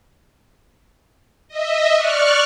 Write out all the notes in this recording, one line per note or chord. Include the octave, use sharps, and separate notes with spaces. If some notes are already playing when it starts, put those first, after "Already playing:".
D#5 E5
D5 C#6 F6 F#6